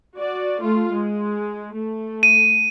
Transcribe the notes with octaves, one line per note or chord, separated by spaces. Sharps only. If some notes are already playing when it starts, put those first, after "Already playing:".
F#4 D5
A3 F4
G#3
A3
D#7